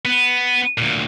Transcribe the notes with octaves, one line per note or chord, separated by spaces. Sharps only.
B3
D2 A#2